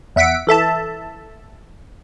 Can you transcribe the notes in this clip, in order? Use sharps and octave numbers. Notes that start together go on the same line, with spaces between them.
E2 E5 F#5 B6 D7
E3 A4 E5 A5